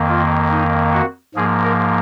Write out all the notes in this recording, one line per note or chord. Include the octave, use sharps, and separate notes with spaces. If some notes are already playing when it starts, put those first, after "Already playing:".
Already playing: F2 D#3 A#3
F4
D#4
F#4
G#2 F3 A#3 G#4
A#4